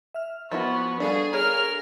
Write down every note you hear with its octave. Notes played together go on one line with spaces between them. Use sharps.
E5 F6
F3 B3 E4 F#4 C#6
G3 B3 D4 G#4 A4 F5
G#4 A#4 C#5 F6